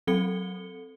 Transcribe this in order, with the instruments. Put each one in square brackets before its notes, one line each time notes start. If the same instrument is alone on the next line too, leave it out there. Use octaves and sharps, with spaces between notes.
[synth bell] F#3 C4 A4 C#7 G7